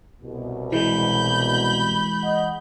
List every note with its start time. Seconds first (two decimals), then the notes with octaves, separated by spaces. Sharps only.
0.22 C2 B2
0.72 E3 G#3 B5 G6
2.23 D#5 F#5